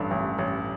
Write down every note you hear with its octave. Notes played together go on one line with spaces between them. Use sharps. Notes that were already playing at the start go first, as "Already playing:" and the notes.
Already playing: A1 G2 D3
A1
A1